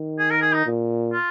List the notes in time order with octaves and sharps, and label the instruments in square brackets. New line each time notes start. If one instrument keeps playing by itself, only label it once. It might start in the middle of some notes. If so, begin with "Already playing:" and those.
Already playing: [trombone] D#3
[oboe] G#4
A#4
G#4
D#4
[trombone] A#2
[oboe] F4